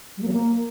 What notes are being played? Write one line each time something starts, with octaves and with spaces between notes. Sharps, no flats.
G3
A#3
F#3
A#3